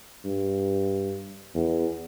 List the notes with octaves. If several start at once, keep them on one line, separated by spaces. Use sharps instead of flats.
G2
E2